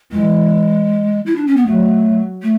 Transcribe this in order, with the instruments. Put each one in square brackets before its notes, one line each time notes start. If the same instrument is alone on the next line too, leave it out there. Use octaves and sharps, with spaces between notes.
[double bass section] E3 [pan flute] G#3
[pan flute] E4
D4
C#4
B3
[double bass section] F#3 [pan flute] A3
[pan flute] A3